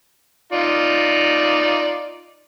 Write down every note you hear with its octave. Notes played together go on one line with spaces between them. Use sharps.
D#4 F4 D5